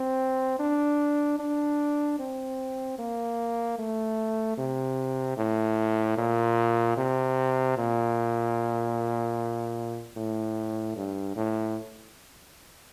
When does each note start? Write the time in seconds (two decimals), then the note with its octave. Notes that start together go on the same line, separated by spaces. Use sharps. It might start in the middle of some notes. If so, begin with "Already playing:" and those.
Already playing: C4
0.59 D4
1.39 D4
2.19 C4
2.99 A#3
3.78 A3
4.58 C3
5.37 A2
6.18 A#2
6.97 C3
7.77 A#2
10.16 A2
10.97 G2
11.36 A2